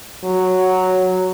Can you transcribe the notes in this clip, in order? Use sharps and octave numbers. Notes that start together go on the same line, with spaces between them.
F#3